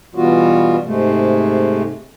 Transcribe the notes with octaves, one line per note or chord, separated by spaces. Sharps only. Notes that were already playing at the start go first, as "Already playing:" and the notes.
B2 E3 G3 B3 F4 F#4
G#2 C3 G#3 A3